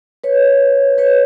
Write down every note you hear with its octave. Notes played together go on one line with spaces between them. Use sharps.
B4 C#5
B4 C#5